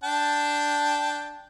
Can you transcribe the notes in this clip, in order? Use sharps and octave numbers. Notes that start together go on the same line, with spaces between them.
D4 G5 A5